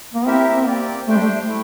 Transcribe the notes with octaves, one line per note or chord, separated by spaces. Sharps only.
A#3
C4 E4 G4 A#4 E5
C4
A#3 C4 G4 D5
A3 D4 G4 C5 G5
G3
A3
A3 E4